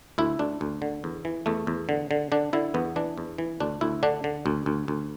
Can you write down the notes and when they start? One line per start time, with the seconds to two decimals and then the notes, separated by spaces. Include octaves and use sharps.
0.18 D2 E4
0.39 D2 D4
0.61 D2
0.82 D3
1.04 E2
1.25 E3
1.46 E2 A3
1.67 E2
1.89 D3
2.11 D3
2.32 D3 D4
2.53 D3 E4
2.74 E2 B3
2.96 E3 D4
3.18 E2
3.38 E3
3.60 D2 D4
3.81 D2 E4
4.03 D3 D4
4.24 D3
4.46 D2
4.66 D2
4.88 D2